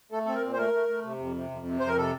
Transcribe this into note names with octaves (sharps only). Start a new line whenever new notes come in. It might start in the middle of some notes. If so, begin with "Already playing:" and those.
A3 A4
C4 A4
A#4
A#2
C5
A3 A#4
A3
A3
C3
F2
C3
F2
C3
F2 C5
A#4
C3 A4